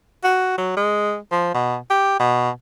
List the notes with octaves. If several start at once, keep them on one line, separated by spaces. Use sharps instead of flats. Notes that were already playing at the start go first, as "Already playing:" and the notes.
F#4
F#3
G#3
F3
B2
G4
B2